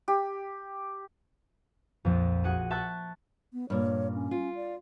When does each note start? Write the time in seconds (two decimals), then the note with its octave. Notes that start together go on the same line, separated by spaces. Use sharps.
0.08 G4
2.05 A#1 F2
2.44 F#4 G#4 F#5 D#7
2.70 E5 A5 C#6 F#6 G6
3.53 B3
3.70 G2 A#2 C#5
4.14 C#4
4.31 F4
4.55 D5